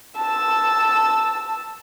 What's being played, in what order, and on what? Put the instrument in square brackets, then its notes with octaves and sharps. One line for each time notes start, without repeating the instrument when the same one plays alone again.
[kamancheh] A5 E6